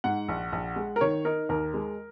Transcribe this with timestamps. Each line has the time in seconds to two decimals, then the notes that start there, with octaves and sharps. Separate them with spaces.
0.04 G#2 F#5
0.29 A#1
0.52 A#1
0.76 G#3
0.96 A#4
1.01 D#3 C#5
1.25 D#4 A#4
1.49 D#2 A#4
1.74 G#3